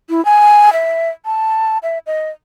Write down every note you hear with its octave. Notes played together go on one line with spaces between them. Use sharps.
E4
G#5
E5
A5
E5
D#5